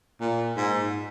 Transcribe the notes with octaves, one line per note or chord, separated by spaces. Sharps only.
A#2
G#2